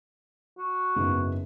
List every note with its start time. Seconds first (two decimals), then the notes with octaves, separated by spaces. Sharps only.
0.58 F#4
0.96 F#1 G#2 B3